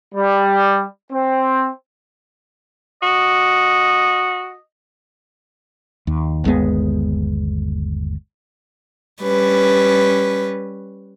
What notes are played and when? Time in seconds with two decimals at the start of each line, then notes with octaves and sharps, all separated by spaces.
0.15 G3
1.13 C4
3.02 F#4 D#5
6.07 D#2
6.44 G1 D#2 G#3 B3
9.23 G3 C#4 B4